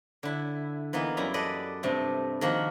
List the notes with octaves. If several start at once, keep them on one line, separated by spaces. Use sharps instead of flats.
D3 E4
E3 A#3 B3 D#4
F#2 G3 E4 A#5
A4 B4 D5 D#5
G2 C3 A3
D#3 F3 A#3 F#4 F#5